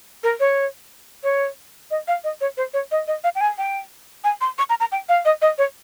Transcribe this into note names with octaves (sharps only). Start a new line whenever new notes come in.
A#4
C#5
C#5
D#5
F5
D#5
C#5
C5
C#5
D#5
D#5
F5
G5
G#5
G5
G#5
C6
C#6
A#5
A#5
G5
F5
D#5
D#5
C#5